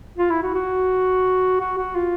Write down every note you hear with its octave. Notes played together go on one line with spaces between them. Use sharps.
F4
E4
F#4
F#4
F#4
F#4
F4